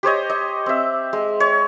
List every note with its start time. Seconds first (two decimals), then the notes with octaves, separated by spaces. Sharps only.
0.03 G4 C5 C#5 D#5
0.30 D#5
0.66 C4 E5
1.13 G#3
1.40 C#5